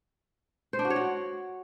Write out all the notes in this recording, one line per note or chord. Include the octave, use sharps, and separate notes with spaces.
C5
D4
F#4
C#5
F#4